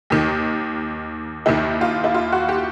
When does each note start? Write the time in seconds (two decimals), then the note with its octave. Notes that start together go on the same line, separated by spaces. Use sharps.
0.10 D#2 D#3
1.46 D#2 D#3 E4
1.81 F4
2.04 E4
2.14 F4
2.32 F#4
2.49 G4